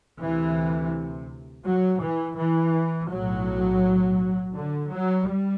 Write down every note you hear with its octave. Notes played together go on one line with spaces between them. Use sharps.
D2 C3 E3
F#3
E3
E3
B1 A2 F#3
D3
F#3
G3